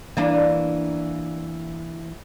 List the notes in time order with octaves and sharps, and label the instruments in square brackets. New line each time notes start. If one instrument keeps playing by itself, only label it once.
[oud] E3 A#3 D4